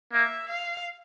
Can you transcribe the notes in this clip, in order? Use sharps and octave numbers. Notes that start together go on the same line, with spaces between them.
A#3 E5
F5